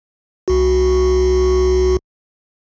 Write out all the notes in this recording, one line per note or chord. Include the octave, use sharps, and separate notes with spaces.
C2 F#4